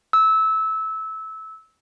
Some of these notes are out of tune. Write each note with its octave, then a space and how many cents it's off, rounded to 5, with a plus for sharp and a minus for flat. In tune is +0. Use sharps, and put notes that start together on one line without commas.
E6 -20